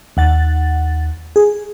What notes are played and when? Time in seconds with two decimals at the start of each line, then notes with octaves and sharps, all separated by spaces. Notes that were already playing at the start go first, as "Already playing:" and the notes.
0.17 D#2 F#5 A6
1.36 G#4